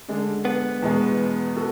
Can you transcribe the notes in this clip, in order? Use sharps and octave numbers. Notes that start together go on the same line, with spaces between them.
D3 G#3 D4
B3
E2 B2 G#3
F#4 A4